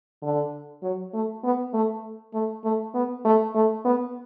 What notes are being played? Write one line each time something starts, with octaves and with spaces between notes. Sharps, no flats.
D3
F#3
A3
B3
A3
A3
A3
B3
A3
A3
B3